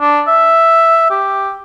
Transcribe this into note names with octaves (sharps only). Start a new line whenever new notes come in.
D4
E5
G4